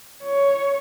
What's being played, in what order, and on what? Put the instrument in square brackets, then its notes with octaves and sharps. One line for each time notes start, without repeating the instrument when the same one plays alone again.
[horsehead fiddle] C#5